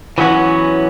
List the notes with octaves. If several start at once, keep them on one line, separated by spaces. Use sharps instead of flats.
E3 F#3 B3 C#4 F#4